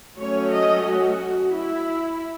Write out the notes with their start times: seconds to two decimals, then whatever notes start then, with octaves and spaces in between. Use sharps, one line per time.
0.18 F#3 A3 C#4 C#5
0.53 D#5
0.86 F#4
1.54 E4